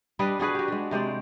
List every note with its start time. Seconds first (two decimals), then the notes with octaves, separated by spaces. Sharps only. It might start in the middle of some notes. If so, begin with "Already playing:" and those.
0.19 G3 D4 B4 D#5
0.39 D4 F#4 G#4 B4
0.55 F#4 G4
0.68 G#3 D4
0.91 C3 G#3 C5 D5